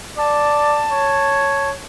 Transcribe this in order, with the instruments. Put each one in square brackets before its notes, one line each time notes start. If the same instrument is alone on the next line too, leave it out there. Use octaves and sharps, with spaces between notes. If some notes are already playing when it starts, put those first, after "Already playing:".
[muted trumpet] D5 [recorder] A5
[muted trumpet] C#5